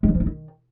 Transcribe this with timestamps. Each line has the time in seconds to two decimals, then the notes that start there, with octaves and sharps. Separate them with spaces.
0.03 G#3
0.09 F#3
0.14 F3
0.20 E4
0.26 D#3